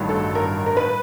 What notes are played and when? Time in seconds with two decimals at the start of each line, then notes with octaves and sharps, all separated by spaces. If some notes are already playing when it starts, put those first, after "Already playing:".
Already playing: A1 G2 D#3 F#3
0.09 A4
0.35 A#4
0.66 A#4
0.77 B4